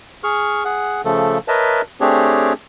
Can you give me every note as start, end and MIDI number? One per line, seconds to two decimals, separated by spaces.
0.24 0.63 68
0.24 0.63 85
0.24 0.63 89
0.65 1.01 68
0.65 1.01 78
1.05 1.38 49
1.05 1.38 53
1.05 1.38 57
1.05 1.38 69
1.48 1.81 70
1.48 1.81 71
1.48 1.81 73
1.48 1.81 75
1.48 1.81 76
1.48 1.81 81
2.01 2.53 57
2.01 2.53 60
2.01 2.53 62
2.01 2.53 67
2.01 2.53 68
2.01 2.53 73